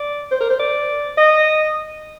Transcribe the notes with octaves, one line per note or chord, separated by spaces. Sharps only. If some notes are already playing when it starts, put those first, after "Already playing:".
Already playing: D5
C5
A#4
C5
D5
D#5